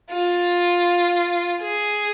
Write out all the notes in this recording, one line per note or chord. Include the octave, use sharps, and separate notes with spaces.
F4
G#4